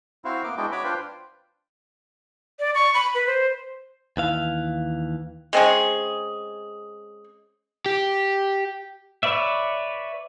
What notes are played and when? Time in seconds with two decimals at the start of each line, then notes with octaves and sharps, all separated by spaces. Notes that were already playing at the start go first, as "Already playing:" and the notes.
0.25 C4 E4 F#4 C5 F5
0.44 A#3 B3 D6
0.57 G#3 B3 D4 E4 F#4 G5
0.72 F#4 C#5 B5 D6
0.84 D4 F4 B4 C5 G5
2.59 D5
2.75 C#6
2.94 B5
3.15 B4
3.27 C5
4.17 D#2 E3 F5
5.53 G#3 C4 C#4 G#4
7.86 G4
9.23 B4 C#5 D5 E5